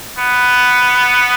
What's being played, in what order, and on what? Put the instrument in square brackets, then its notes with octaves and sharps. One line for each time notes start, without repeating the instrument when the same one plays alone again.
[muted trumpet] B3